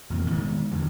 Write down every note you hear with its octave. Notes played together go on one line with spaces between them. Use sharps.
E1 F2 G3 A#3
D#3 G#3 B3
E2 D3 E3